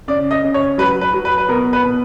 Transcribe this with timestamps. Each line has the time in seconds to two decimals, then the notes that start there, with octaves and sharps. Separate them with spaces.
0.08 C#3 D5
0.31 D#5
0.44 C#3
0.54 C#5
0.78 F#3 B4
1.01 B4
1.13 F#3
1.25 B4
1.38 B4
1.49 B2 A#4
1.73 B4
1.84 B2